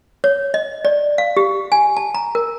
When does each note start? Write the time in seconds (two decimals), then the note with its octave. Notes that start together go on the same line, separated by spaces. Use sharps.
0.24 C#5
0.54 D#5
0.85 D5
1.18 F5
1.37 G4
1.72 G#5
1.97 A5
2.14 A#5
2.35 A#4